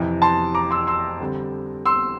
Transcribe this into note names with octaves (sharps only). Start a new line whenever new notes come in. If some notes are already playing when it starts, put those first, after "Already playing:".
Already playing: F2 C3 E3
A5 C6
A#5 D6
C6 E6
C6 E6
D3 G3 C4
C6 E6